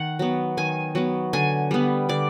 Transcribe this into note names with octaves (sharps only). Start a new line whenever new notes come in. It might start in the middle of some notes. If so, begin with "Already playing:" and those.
Already playing: D#3 F#5
F#3 B3
D#3 G#5
F#3 B3
D3 G#5
G3 B3
D3 D5